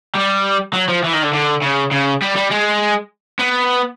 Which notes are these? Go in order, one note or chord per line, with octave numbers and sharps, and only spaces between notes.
G3
F#3
F3
E3
D#3
D3
D3
C#3
C#3
G3
G3
G#3
B3